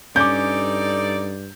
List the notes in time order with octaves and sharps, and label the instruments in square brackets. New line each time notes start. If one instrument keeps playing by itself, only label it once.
[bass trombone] G2 [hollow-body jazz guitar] C#4 [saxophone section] D#4 A4 D5 [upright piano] D6 G6